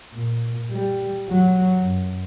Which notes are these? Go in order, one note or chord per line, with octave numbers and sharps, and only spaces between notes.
A#2
G3
F#3
F#2